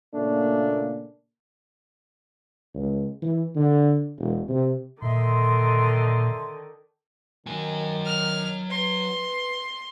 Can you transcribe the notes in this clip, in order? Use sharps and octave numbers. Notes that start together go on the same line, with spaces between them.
A#2 C#3 A3 A#3 D4
C#2
E3
D3
E1
C3
A#2 D3 D#3 D#5 E5 C6
D#3 F#3 G#5
F6
B4 C6